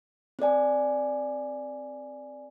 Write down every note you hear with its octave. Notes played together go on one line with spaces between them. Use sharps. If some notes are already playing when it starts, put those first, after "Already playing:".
C4 A4 D5 G#5